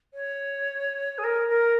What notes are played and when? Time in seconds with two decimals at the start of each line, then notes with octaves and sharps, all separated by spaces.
0.14 C#5
1.18 G#4
1.24 A#4
1.48 A#4